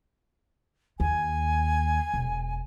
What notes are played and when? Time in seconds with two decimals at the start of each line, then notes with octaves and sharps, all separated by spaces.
1.00 D#2 G#5
2.14 E1